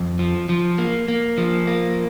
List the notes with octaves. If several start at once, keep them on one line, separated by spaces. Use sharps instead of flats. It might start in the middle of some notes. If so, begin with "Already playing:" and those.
Already playing: F2
F3
F3
A#3
A#3
F3
A#3